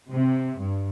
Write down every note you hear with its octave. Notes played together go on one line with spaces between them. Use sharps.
C3
G2